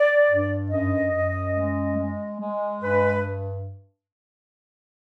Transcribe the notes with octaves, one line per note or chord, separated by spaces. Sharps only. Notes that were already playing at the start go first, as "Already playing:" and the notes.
Already playing: D5
G2
F#2 D#5
F#2
G#3
G#3
G#3
G2 B4